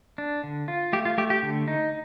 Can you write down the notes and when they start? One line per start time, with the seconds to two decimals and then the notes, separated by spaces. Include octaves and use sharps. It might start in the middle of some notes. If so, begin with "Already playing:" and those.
0.18 D4
0.44 D3
0.68 F4
0.93 A3 G4
1.05 F4
1.18 A3 G4
1.30 G4
1.43 D3
1.68 D#4